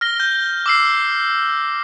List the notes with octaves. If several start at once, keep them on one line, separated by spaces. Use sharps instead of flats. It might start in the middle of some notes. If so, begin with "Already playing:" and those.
F6 A#6 G7
G6
D6 E6 C7